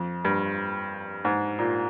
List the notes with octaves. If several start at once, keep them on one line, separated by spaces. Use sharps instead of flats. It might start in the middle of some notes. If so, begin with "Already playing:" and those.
Already playing: F2
G2
G#2
A#2